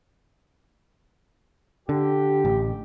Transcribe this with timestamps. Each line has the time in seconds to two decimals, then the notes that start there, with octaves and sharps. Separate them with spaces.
1.89 D3 G4
2.45 A1